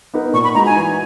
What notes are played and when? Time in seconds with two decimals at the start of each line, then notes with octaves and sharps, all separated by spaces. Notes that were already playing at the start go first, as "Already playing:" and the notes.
0.14 B3 D#4 A#4
0.33 A#2 C#6
0.44 B5
0.55 G#3 D#4 F#4 A#5
0.66 G#5
0.75 E3